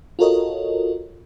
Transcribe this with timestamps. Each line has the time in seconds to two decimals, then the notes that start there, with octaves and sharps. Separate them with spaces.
0.19 F4 F#4 A4 A#4 C#5 D#5